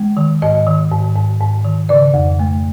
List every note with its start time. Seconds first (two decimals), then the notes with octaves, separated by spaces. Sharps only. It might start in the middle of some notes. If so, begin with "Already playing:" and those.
Already playing: G#3
0.17 D#3
0.42 G#2 D#5
0.66 D#3
0.91 G#2
1.16 G#2
1.40 G#2
1.65 D#3
1.89 C#3 D5
2.14 F2
2.39 A3